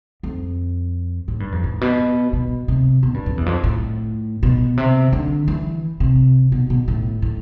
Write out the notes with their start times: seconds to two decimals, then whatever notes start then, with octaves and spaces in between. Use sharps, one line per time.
0.23 F2
1.28 A2
1.40 G2
1.52 F2
1.64 A2
1.81 B2
2.33 B2
2.68 C3
3.03 B2
3.14 G2
3.26 F2
3.37 E2
3.46 F2
3.64 A2
4.43 B2
4.77 C3
5.13 D3
5.48 E3
6.00 C3
6.52 B2
6.70 B2
6.88 A2
7.22 A2